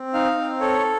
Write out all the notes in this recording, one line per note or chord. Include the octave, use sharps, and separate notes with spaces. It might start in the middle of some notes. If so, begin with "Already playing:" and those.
Already playing: C4
D#4 F5
C4
A4 C#5